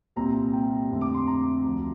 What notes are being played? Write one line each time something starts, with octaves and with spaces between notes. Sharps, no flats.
C2 A#2 G3 C4 A#5
G5
F2 D3 A3 C4
D6
C6
A#5
D2 D3 F3